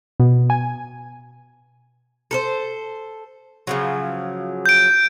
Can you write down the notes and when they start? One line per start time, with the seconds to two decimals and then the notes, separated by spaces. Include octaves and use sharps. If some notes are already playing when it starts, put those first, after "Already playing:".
0.20 B2
0.50 G#5
2.31 A4 A#4 C5
3.67 C#3 F3 F#3
4.66 G6 D7